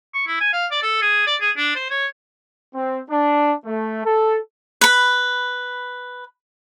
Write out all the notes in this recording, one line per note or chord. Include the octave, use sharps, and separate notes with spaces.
C#6
E4
G#5
F5
D5
A4
G#4
D5
G#4
D4
C5
C#5
C4
D4
A3
A4
B4 B5